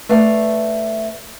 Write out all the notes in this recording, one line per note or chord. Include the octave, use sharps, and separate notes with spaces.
A3 B4 D5 F5